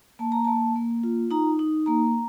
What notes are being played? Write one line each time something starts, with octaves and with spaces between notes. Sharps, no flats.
A#3 A5
A#5
A#3 A5
A#3
F4
D#4 A#5
D#4
A#3 A#5